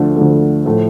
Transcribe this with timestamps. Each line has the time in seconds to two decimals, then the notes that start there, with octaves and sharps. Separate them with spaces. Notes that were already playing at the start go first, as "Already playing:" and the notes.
Already playing: D2 D3 F3 A3
0.16 D2 D3 F3 A3
0.66 A2 F3 A3